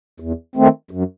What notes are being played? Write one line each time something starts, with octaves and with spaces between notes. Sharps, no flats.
E2
D#3 A3 C4
F#2